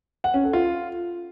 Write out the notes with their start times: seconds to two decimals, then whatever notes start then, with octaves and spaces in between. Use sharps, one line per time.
0.24 F#5
0.34 C#4
0.44 A4
0.53 F4